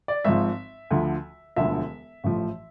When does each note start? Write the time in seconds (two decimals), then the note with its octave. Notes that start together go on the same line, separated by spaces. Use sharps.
0.08 D5
0.25 G#1 G#2 F3 E5
0.91 D2 D3 F3
1.56 E1 D2 D3 F3 E5
2.24 A1 A2 F3